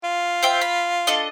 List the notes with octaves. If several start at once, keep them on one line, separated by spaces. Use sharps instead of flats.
F4
C5 E5 G5
B5
D4 A4 D#5